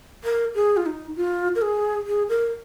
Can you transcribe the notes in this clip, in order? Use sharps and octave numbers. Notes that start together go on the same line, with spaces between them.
A#4
G#4
F4
D#4
F4
A#4
G#4
G#4
A#4